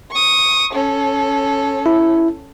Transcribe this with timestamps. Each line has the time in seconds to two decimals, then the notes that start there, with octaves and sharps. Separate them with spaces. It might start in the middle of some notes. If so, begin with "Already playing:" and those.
0.11 C#6 D#6
0.73 C#4 A4
1.86 E4